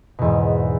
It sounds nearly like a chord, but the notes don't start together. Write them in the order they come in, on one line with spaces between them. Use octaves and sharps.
B2 E2 G#2